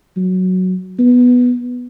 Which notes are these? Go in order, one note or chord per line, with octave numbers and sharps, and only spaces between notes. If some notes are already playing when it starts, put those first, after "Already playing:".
F#3
B3